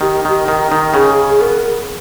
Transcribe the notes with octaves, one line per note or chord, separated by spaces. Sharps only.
D#3 G4
D#3
D#3
D#3
C#3 G#4
G#4
B3 A#4